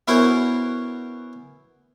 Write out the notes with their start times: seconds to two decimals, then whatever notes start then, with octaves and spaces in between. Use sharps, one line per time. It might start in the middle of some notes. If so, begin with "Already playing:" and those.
0.08 B3 C#4 E4 F#4 A#4 C5